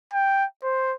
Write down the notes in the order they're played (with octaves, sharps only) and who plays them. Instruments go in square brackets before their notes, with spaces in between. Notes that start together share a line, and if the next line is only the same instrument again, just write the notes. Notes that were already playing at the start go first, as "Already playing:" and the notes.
[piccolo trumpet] G5
C5